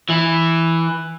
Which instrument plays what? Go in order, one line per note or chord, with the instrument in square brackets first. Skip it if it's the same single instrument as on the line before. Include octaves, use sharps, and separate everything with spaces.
[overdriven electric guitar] E3 E4